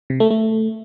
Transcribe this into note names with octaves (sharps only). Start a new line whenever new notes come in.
C3
A3
A3